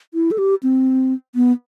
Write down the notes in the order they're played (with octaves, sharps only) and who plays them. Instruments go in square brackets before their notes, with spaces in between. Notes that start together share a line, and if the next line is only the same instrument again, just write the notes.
[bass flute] E4
A4
G4
C4
B3